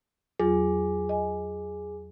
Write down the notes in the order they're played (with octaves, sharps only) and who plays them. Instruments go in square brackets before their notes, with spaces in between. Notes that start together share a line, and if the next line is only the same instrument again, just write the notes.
[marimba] E2 F#3 F4 [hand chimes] G#4
[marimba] D#5 G#5